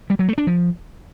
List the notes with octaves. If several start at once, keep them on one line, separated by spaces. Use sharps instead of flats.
G3
F#3
A3
D4
F3